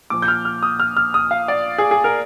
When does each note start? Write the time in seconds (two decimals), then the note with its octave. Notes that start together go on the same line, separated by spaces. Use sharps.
0.10 A#2 F3 D6
0.22 G6
0.28 F6
0.45 F6
0.63 D#6
0.80 F6
0.97 F6
1.14 D#6
1.31 F5
1.48 D5
1.78 G#4
1.91 G#4
2.04 A#4